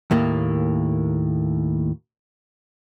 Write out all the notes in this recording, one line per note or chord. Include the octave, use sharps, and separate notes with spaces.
D#2 A2 A#3